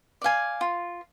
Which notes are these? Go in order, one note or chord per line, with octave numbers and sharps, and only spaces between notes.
D5 F5 G#5
F4